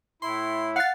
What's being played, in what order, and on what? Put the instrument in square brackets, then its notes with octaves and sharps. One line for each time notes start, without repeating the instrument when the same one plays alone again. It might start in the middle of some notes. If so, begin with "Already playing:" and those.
[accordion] A2 E4 [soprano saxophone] C6
[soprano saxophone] F5 [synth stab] F#5 A6